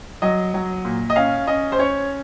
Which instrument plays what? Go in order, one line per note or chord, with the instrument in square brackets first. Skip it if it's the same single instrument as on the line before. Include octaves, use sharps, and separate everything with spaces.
[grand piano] F#3 D#5
F#3
A#2
D#5
C#4 F5
C#4 D#5
C5
C#4 C#5